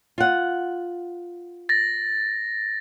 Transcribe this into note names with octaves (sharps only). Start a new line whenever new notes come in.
F4 F#5
A6 A#6